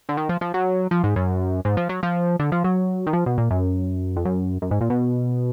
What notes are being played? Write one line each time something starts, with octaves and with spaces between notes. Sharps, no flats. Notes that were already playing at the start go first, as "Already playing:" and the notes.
D3
D#3
F3
F3
F#3
F3
G#2
F#2
G#2
F3
F#3
F3
D3
F3
F#3
D#3
F3
B2
A#2
F#2
F2
F#2
F#2
G#2
A#2
B2